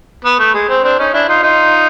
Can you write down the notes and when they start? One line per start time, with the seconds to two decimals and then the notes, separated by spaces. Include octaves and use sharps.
0.25 B3
0.39 A3
0.54 G#3
0.69 C4
0.83 C4 D4
0.99 C#4 D#4
1.13 D4 E4
1.28 D#4 F4
1.43 D#4 F4